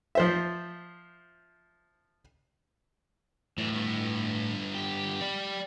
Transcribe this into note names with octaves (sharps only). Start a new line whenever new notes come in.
F3 C5 E5
F#2 A2 E3
G2 B3
G4
D5 B5